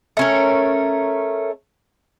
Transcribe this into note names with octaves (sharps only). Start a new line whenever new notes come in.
A3 C#4 A#4